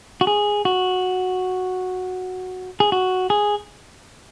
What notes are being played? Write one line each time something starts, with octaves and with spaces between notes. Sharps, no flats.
F#4
G#4
F#4
G#4
F#4
G#4